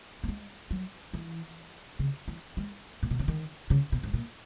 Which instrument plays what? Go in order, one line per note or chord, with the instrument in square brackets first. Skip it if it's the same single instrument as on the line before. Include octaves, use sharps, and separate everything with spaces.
[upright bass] A#3
G#3
F#3
E3
C#3
E3
G#3
A#2
B2
C#3
D#3
C#3
B2
G#2
A#2